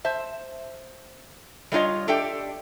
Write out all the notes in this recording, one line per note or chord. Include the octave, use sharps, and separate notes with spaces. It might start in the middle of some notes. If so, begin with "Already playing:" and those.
C5 E5 A5
G3 A3 D4 F4 C#5 D#5
D4 G4 A4 E5 G5